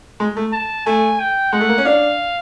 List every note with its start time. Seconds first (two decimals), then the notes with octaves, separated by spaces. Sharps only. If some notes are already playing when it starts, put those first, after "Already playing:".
0.20 G#3
0.36 A3
0.53 A5
0.86 A3 G#5
1.20 G5
1.52 G#3 F#5
1.61 A3
1.69 A#3
1.78 C#4
1.85 D4 F5